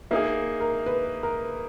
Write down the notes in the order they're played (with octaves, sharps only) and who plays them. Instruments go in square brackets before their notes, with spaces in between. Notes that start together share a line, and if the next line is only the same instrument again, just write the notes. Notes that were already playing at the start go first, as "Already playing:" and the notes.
[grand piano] A#3 D#4 G#4 [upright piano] E5
[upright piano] A#4
B4
A#4